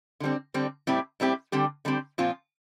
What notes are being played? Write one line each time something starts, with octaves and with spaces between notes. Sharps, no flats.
D3 G3 C4
D3 G3 C4
A2 G3 C4 E4 G4
A2 G3 C4 E4 G4
D3 G3 C4 G4
D3 G3 C4 G4
A#2 F3 C4 F4